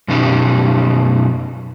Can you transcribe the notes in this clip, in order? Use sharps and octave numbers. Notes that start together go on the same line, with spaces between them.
F#2 B2 C#4 D#4 G4